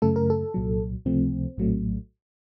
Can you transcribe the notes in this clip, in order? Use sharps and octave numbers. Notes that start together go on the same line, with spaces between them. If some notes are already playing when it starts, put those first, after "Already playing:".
F#2 C#3 A3 A4
A#4
A4
C2 A#2 F#3
C#2 C3 F3 A3 C4
A#1 A2 F#3 A3